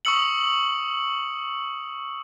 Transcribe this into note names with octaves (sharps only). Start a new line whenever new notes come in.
C#6 D#6 E6 C#7 F#7